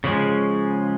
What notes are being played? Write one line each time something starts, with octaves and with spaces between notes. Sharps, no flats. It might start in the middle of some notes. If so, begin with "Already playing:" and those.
C#3 F3 G#3 C#4